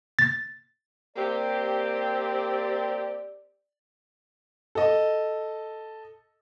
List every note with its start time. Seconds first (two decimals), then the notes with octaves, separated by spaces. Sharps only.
0.19 A6
1.16 A#3 C4 G4 D5
4.75 A4 D#5